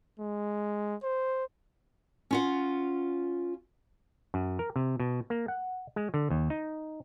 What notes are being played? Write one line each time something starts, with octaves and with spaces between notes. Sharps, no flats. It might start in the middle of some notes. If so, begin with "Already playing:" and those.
G#3
C5
C#4 F4 F#5
F#2
A#4
C3
B2
A#3
F#5
G#3
D3
D#2
D#4